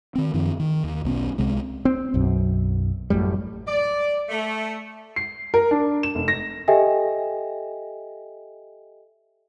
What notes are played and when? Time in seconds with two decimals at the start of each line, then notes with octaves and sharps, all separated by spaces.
0.15 D#3 C4
0.34 F#2 D#3 F3
0.60 D#3
0.84 D#2
1.05 B1 B3 C#4
1.38 C2 C3 G#3
1.85 C4
2.14 B1 F#2
3.10 A1 F#2 A2 G3
3.67 D5
4.29 A3
5.16 C7
5.54 A#4
5.71 D4
6.03 E7
6.15 F1
6.28 A#6
6.68 G4 A4 D#5 E5 G5 G#5